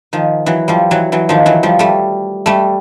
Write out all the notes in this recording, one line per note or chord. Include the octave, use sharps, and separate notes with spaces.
D#3 F3
E3 F#3
F3 G3
E3 F#3
E3 F#3
D#3 F3
E3 F#3
F3 G3
G3 A3
G3 A3